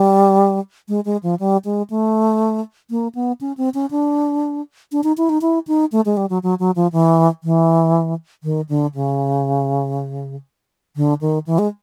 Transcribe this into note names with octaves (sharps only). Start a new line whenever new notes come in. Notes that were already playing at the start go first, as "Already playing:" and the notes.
Already playing: G3
G#3
G#3
F3
G3
G#3
A3
A#3
B3
C#4
C4
C#4
D4
D4
D#4
E4
D#4
E4
D#4
A3
G#3
G3
F#3
F#3
F#3
F3
E3
E3
D#3
D3
C#3
D3
D#3
E3
G#3